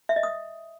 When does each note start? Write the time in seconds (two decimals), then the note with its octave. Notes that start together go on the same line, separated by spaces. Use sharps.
0.09 E5
0.16 D#5
0.23 D#6